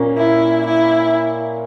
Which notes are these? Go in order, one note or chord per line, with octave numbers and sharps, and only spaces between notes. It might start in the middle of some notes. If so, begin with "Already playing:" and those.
Already playing: A#2 A#3 C#4
E4
E4